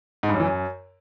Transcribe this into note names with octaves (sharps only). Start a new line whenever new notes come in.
G#2
G2
F#2
E3
F#2